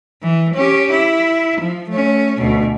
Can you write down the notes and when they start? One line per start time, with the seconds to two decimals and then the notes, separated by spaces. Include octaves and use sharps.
0.22 E3
0.54 C#4 G4
0.91 E4
1.60 F3
1.90 A3 C#4
2.38 D2 B2